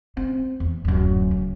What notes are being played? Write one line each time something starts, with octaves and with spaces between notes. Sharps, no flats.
C4
E2
D1 F#2
C#3